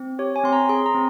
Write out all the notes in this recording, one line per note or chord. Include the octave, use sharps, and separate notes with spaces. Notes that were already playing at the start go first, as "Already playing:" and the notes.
Already playing: C4
G4 C#5
G#5
C4 C6
A#5
G#4 C6
A#5
C4